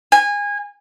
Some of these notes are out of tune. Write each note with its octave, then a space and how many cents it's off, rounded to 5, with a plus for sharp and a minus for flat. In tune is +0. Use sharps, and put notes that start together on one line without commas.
G#5 -25